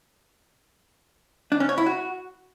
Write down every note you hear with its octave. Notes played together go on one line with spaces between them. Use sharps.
D4
C#4
C#5
E4
F#4